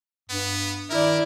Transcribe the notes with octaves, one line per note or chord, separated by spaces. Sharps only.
G2 B3
D#3 E4 A#4 D5